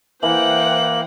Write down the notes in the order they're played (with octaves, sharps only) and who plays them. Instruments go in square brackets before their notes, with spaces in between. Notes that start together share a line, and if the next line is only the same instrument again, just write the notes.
[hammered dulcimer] E3 [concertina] A#3 [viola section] C5 F#5 G5 [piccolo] F#7